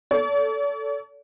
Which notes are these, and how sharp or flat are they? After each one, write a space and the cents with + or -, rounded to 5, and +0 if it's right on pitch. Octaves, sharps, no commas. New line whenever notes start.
A4 +5 D5 -45